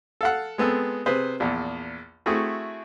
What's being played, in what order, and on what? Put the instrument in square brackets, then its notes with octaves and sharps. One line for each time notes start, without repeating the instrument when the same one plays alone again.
[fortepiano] A4 F5 F#5
G#3 B3 C4 A4
C3 G#4 B4 C5
A#1 E2
A3 C4 E4 F#4 G#4